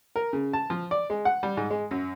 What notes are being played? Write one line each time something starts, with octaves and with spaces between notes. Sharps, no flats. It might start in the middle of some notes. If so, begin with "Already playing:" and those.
A#4
C#3
A5
F3
D5
G#3
F#5
G3
G#2
G#3
F#2